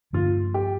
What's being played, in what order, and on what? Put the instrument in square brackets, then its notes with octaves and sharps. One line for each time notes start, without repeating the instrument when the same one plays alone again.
[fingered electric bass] G2 D3 F3 A#3 [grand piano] F4
[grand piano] G4